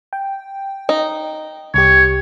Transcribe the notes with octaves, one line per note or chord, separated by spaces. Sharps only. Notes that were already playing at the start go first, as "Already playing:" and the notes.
G5
D#4
C2 G4 C#5